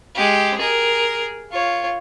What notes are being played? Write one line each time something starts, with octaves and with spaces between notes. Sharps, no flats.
G#3 G4
G#4 A#4
F4 C#5